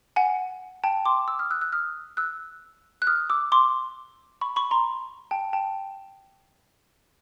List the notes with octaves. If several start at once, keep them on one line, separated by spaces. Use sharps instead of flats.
F#5 G#5
G5 A5
C6 D6
D6 E6
D#6 F6
E6 F#6
E6 F#6
D#6 F6
E6 F#6
F#6
D#6 F6
D6 E6
C6 D6
B5 C#6
B5 C#6
A#5 C6
G5 A5
G5 A5